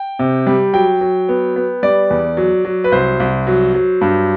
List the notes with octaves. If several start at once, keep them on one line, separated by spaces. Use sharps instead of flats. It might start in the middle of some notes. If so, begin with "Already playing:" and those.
Already playing: G5
C3
G3
F#3 G5
F#3
B3
B3
G3 D5
E2
F#3
F#3
B4
C2 C5
C2
F#3
F#3
G2